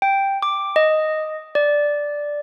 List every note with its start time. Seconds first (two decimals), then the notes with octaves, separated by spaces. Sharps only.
0.02 G5
0.43 D6
0.76 D#5
1.55 D5